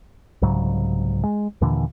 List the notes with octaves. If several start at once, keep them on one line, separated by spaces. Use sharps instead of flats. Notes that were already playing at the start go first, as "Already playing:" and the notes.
C2 G#2 C#3 F#3
G#3
D#2 A#2 D3 E3